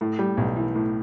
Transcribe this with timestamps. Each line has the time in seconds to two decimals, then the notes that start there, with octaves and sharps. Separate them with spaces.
0.01 A2
0.19 G3
0.37 B1
0.56 E3
0.75 A2